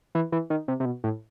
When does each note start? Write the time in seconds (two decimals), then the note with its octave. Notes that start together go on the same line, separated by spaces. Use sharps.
0.15 E3
0.32 E3
0.50 D#3
0.68 C3
0.80 C3
0.86 B2
1.04 A2